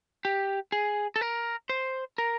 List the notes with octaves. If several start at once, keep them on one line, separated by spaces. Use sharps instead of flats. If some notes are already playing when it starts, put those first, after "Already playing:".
G4
G#4
A4
A#4
C5
A#4